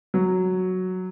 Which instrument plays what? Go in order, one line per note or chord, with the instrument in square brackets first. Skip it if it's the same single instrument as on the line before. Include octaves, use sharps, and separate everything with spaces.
[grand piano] F#3